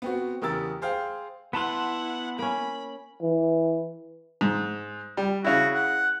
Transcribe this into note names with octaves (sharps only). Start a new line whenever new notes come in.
B3 C4 F#4
E2 C#3 G4 A#4 E6 A6
G#4 C5 F5 G5
B3 E4 B4 F#5 A5 C6
A#3 C#4 B5
E3
G#2
G3
C#3 E4 F#4
F#5